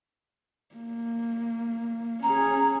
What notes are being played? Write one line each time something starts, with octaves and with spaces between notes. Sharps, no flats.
A#3
C#4 G#4 A#5